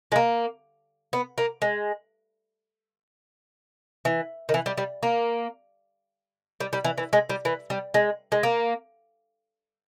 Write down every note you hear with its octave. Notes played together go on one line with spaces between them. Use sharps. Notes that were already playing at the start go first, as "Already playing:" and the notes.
G#3
A#3
B3
A#3
G#3
E3
D#3
E3
G3
G3
A#3
G3
G3
E3
E3
G#3
G3
E3
G3
G#3
G#3
A#3